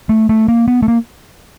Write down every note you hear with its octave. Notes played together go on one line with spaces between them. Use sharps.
A3
A3
A#3
B3
A3
A#3